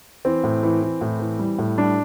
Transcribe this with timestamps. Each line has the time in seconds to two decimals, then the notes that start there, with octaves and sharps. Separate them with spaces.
0.25 E3 C4
0.44 A2
0.63 E3
0.82 E3
1.01 A2
1.20 E3
1.39 G3
1.59 A2
1.78 G3 D4